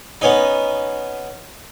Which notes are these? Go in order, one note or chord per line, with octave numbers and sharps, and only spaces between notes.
B3 C#4 D#4